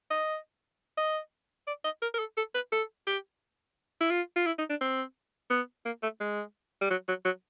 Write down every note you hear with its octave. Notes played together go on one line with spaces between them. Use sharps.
D#5
D#5
D5
D#5
A#4
A#4
A4
A4
B4
A4
G4
E4
F4
F4
E4
D#4
D4
C4
B3
A#3
A3
G#3
G3
F#3
F#3
F#3